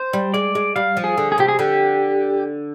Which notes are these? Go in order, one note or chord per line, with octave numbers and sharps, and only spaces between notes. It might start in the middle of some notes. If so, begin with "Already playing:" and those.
Already playing: C5
G3
G#3 D5
G#3
G3 F5
F3
G#4
D3
G#4
C3 G4
G#4
D3 G4